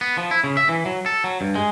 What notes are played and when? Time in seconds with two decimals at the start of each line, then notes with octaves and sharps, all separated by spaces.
0.01 B3
0.17 F3
0.31 E4
0.44 C#3
0.57 E5
0.69 E3
0.86 F#3
1.06 A4
1.24 F#3
1.41 G2
1.55 G#3